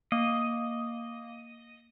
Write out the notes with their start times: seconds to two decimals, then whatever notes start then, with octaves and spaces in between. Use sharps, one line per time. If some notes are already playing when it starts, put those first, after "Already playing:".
0.12 A#3 D#5